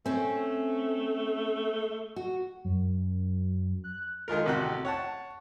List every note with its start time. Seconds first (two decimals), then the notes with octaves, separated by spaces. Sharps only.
0.06 A3 C4 C#4
2.16 F#4
2.64 F#2
3.84 F#6
4.28 D#3 G#3 F4 A#4
4.46 A1 C3 F#4 G5 F#6
4.85 C#5 F#5 A5